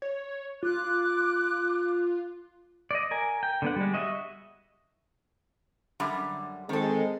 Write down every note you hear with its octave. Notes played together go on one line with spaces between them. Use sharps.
C#5
F4 D6 F#6
D5 D#5
A#4 G#5
G5
D3 B3 F#5
G3 G#3
F#4 D#5 E5
F#2 D3 G3
D#3 G#3 C4 A4